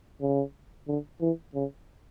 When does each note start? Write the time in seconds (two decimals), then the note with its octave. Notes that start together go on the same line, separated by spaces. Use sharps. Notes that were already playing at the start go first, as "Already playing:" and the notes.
0.21 C#3
0.88 D3
1.21 E3
1.55 C#3